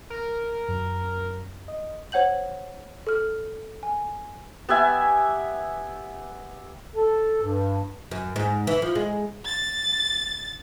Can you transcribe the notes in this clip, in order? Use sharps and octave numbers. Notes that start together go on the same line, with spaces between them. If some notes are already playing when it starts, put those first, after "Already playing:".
A#4
F#2
D#5
C5 C#5 F#5 G6 F#7
A4 F6
G#5
B3 G4 E5 G#5
A4
G2
F#2
G#2
E3
F3
G#3
A6